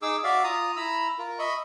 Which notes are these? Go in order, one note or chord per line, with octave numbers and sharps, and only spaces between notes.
D#4 G#4 D6 E6
F#4 D5 E5 F5
F4 A#5 D#6
E4 A#5 B5 E6
F4 A#4
D#5 E5 B5 C#6